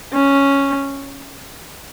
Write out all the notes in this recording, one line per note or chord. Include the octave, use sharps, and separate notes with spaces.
C#4